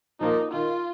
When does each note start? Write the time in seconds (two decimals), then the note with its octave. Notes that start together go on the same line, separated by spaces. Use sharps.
0.20 F3 A#3 D#4 F4
0.52 D#3 F4